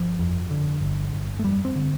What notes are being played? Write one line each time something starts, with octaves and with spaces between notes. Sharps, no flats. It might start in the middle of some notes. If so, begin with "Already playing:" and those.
Already playing: G1 F3
F2
D3
G1
G1
A3
F2 G3
C4
D3